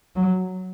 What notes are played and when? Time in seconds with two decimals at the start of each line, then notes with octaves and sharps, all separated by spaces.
0.16 F#3